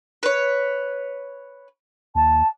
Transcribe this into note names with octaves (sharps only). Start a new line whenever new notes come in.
B4 C#5
D#2 A5